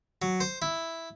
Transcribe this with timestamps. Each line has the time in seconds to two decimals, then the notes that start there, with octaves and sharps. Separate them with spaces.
0.22 F#3
0.40 C5
0.62 E4